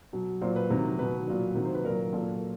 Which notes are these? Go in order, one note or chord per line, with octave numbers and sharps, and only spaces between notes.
B2 F#3
A#2 F#3 C5
B4
C3 D#3 F#3
B2 F#3 B4
A#2 F#3
C3 D#3 F#3
C5
B4
A#2 F#3 A#4
A#2 F#3 A4